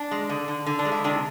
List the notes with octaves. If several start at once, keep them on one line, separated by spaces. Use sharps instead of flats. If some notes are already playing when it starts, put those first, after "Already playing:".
Already playing: D4
G#3
D3
D3
D3
D4
G#3
E4
C3 D4